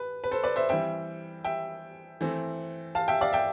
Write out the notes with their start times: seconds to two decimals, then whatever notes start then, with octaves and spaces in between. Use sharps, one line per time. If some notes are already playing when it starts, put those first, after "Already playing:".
Already playing: B4
0.24 B4
0.31 A4 C5
0.44 B4 D5
0.56 C5 E5
0.69 E3 G3 C4 E5 G5
1.45 E5 G5
2.21 E3 A3 C4
2.95 F5 A5
3.08 E5 G5
3.21 D5 F5
3.33 E5 G5